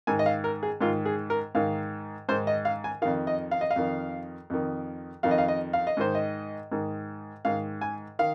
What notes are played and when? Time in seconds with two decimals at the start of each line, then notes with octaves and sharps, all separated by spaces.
0.07 G#2 D#3 G#5
0.19 D#5
0.26 F5
0.44 A#4
0.63 G#4
0.81 G#2 D#3 F4
1.06 G#4
1.30 A#4
1.55 G#2 D#3 F5
2.29 G#2 C5
2.31 D#3
2.47 D#5
2.65 F5
2.84 G#5
3.02 D#3 F5
3.05 F2
3.27 D#5
3.51 F5
3.61 D#5
3.71 F5
3.76 F2 D#3
4.50 F2 D#3
5.23 F2 D#3 F5
5.31 D#5
5.38 F5
5.48 D#5
5.73 F5
5.87 D#5
5.97 G#2 D#3 C5
6.15 D#5
6.72 G#2 D#3
7.45 G#2 D#3 F5
7.81 G#5
8.19 D#3 F5